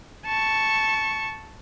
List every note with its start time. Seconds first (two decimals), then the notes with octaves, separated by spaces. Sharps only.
0.27 A5 C#6